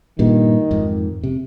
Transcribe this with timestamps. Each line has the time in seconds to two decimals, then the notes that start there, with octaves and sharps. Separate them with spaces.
0.19 G2 A#2 D#3
0.71 F2 G#2
1.24 C3